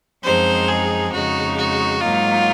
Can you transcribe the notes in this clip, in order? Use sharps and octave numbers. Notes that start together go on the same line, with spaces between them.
F#2 F3 G#3 C4 D#4 C5
G#4
F2 C#3 G#3 D#4 F#4
F#4
G#2 F#3 A#3 D#4 F4